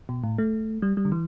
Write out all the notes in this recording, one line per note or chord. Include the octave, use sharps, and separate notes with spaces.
B2
A2
A3
G3
G3
D3
E3